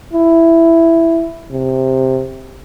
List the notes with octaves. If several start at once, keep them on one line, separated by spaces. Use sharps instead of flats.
E4
C3